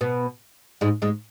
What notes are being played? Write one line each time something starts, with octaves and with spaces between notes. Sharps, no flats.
B2 B3
G#2 G#3
G#2 G#3